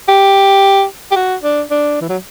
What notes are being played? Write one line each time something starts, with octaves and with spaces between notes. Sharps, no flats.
G4
G4
F#4
D4
D4
E3
F#3